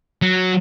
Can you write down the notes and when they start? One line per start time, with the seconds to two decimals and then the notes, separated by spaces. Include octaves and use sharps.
0.22 F#3